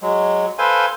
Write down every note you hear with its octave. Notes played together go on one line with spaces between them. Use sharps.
F#3 G#3
A4 B4 C5 F5 G#5 C6